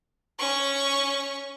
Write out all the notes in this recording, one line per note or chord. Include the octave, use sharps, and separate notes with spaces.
C#4 C#6